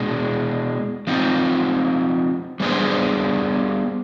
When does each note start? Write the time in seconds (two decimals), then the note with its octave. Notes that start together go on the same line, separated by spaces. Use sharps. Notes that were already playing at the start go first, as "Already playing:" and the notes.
Already playing: B2 G#3 D4
1.07 F3 C4 D#4
2.60 G3 B3 D4 G#4 C5